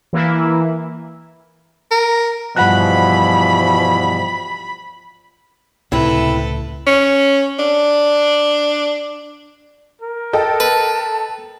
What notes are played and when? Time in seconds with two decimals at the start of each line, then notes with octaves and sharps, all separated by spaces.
0.13 E3 A#3 E4
1.91 A#4
2.56 G2 B2 E3 F3 G3 F#5 B5 F#6
5.92 C#2 A2 C3 E4 A4 B4
6.86 C#4
7.59 D4
10.02 A#4
10.33 A4 D#5 G5 A5
10.60 B4